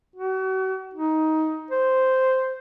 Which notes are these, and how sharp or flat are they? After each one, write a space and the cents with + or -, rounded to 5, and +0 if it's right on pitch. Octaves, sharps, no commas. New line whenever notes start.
F#4 +40
D#4 +15
C5 -5